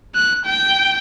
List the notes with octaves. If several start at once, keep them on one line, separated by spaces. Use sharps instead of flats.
F#6
G5